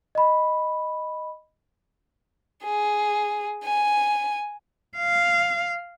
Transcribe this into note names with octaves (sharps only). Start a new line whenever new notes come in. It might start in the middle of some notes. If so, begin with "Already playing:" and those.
D#5 B5
G#4
G#5
F5